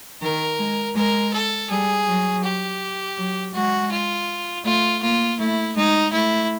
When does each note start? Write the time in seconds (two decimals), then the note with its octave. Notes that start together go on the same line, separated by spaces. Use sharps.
0.22 D#3 A#4
0.59 G#3
0.95 G#3 A#4
1.33 A4
1.70 G3 G#4
2.07 F#3
2.44 G4
3.18 F#3
3.54 G#3 F#4
3.92 F4
4.65 A3 F4
5.02 A#3 F4
5.39 A3 E4
5.76 G#3 D#4
6.13 A3 E4